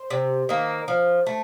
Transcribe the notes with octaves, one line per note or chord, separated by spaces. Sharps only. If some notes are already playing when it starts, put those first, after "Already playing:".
Already playing: C5
C3
D#3 A#3
F3
A3